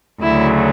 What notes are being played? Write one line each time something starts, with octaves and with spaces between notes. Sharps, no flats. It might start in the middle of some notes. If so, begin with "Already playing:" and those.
D2 C#3 F#3 E4